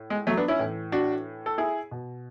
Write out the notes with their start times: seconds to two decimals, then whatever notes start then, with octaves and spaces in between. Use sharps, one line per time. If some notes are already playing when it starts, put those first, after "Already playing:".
Already playing: A2
0.10 G#3
0.27 F#3 A3
0.37 B3 D4
0.48 C#4 E4
0.59 A2 E3
0.92 D4 F#4
1.46 A4
1.58 E4 G#4
1.91 B2